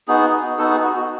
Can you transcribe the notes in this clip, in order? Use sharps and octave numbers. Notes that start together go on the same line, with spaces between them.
B3 D#4 F#4 G#4
B3 D#4 F#4 A4
G#4
F#4
F#4